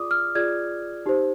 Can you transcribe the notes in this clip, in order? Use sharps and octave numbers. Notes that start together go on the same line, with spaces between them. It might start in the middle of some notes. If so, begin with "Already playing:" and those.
Already playing: F4 G#4 D5 D6 D#6
F6
F4 G#4 D5 G#6
D#4 G4 C5